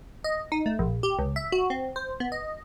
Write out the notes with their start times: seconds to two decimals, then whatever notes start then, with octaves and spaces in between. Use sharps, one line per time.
0.24 D#5
0.52 D#4
0.66 A3
0.79 A#1
1.03 G4
1.19 C#2
1.36 E5
1.52 F#4
1.70 C4
1.96 C5
2.20 B3
2.32 D#5